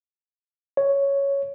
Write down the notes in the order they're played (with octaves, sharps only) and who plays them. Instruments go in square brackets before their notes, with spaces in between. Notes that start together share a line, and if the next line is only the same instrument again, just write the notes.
[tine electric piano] C#5